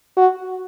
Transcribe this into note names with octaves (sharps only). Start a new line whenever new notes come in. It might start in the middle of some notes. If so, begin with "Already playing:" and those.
F#4